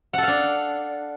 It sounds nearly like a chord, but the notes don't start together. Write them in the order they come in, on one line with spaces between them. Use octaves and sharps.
F#5 A4 F5 D4